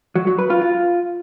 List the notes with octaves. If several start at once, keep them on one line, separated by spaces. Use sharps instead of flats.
F#3
F#3
B4
F4
F4